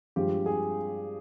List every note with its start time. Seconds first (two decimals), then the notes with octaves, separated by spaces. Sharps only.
0.16 G2 F3 G#3 G4
0.46 G#4